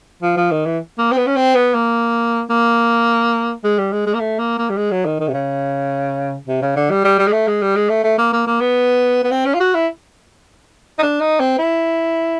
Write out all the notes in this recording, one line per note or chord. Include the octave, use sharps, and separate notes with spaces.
F3
F3
D#3
E3
A#3
C4
B3
C#4
C4
B3
A#3
A#3
G#3
G3
G#3
G#3
A#3
A3
A#3
A#3
G3
G#3
F#3
D#3
D#3
C3
C#3
C3
C#3
D3
G3
G3
G3
G#3
A3
G#3
G3
G#3
A3
A3
A#3
A#3
A#3
B3
B3
C4
C#4
F4
F#4
E4
D#4
D4
D#4
C4
E4